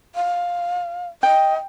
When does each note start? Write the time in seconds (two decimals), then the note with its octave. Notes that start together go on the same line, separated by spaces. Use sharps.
0.15 F5
1.23 D#5 G5